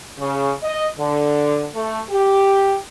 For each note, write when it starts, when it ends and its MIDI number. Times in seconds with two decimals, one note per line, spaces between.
0.19 0.52 49
0.63 0.87 75
0.98 1.64 50
1.75 2.00 57
2.10 2.76 67